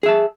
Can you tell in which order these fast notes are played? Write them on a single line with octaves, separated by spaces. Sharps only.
G#4 E5 A5